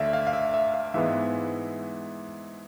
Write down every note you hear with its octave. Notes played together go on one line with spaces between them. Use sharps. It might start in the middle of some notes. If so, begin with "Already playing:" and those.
Already playing: D2 D3 A3 D5 E5 F5
F5
F5
E5
E5
F5
G#2 E3 G#3 B3 E5